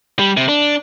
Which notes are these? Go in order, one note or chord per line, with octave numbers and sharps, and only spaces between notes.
G3
C3
D4